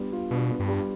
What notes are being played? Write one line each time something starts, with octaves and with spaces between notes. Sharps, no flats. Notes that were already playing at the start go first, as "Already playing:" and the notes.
Already playing: G3 B3 D4 F4
F4
B2 D4
B3
G2
G3